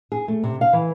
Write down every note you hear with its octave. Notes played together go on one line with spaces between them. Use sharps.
G#4
A3
C3
F5
E3